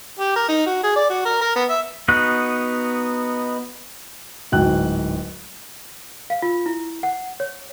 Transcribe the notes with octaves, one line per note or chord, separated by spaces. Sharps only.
G4
A#4
D#4
F#4
G#4
D5
F#4
A#4
A#4
B3
E5
B3 D#4 F#4 F#6
D1 G#2 F#4 G5 F#6
F5
F4
E4
F#5
C#5